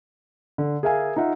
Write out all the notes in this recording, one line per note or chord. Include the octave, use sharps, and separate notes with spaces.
D3
G#4 A#4 E5 F5 G#5
D#4 F4 E5 F#5